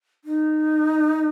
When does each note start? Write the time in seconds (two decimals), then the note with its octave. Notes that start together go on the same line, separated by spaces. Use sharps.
0.25 D#4